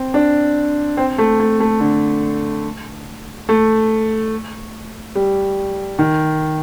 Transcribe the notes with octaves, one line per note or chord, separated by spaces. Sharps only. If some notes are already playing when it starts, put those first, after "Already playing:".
Already playing: C4
D4
C4
A3
A3
A3
D3
A3
G3
D#3